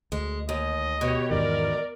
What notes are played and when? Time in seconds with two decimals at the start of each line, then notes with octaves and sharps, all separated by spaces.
0.12 D2 G#3
0.49 D#2 D#5
1.01 B2 G4 C#5
1.31 E2 G#2 D#3 A#4 D5